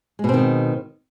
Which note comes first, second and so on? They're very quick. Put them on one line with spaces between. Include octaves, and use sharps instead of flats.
G#3 B2 C4 D#3